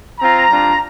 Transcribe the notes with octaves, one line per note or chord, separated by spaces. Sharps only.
C4 F4 A#5
G3 D4 F4